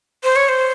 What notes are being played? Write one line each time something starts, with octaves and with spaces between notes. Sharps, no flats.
C5
C#5
C5